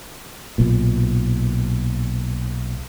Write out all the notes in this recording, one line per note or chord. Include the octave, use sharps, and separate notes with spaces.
B1 A#2